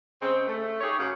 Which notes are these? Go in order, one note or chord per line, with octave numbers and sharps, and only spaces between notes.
C#3 G#3 C4
A3
D#4 G4 G#4 C#5
F#2 C#3